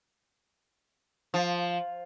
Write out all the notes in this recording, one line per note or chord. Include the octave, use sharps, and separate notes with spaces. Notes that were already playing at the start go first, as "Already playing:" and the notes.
F3